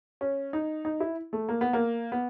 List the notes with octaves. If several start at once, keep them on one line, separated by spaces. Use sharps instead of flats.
C#4
D#4
D#4
E4
A3
A#3
B3
A#3
B3